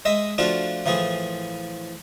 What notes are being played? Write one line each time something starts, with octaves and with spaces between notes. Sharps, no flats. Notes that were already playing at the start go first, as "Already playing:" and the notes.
G#3 D#5 E5
F3 A3 D4 F4 F#4
A2 E3 F3 G#4